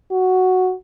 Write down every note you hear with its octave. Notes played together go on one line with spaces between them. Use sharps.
F#4